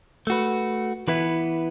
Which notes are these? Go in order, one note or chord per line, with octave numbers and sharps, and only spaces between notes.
A3 F#4 B4
E3 B3 E4 B4